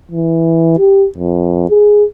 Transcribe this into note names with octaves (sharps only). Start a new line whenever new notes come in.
E3
G4
F2
G#4